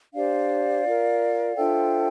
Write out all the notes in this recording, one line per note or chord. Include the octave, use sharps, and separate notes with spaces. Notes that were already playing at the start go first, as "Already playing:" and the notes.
D4 G4 C5 D5 F5
F4 A#4
D4 F4 A4 C5 E5 G5